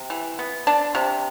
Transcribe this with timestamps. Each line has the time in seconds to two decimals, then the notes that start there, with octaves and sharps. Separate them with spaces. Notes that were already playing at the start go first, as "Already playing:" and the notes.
Already playing: C3
0.10 E3
0.39 B3
0.67 D4
0.95 C3